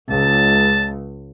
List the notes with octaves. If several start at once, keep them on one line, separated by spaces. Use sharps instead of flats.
C#2 A5